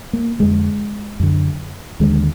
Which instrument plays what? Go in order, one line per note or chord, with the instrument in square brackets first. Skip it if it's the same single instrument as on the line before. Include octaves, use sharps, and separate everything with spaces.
[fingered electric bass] A#3
F2 D3 G#3
F#2 D3
D#2 D3 G#3